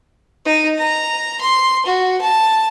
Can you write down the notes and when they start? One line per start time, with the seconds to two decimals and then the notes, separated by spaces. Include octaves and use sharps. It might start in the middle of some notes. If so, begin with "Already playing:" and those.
0.45 D#4
0.78 A#5
1.41 C6
1.86 F#4
2.21 A5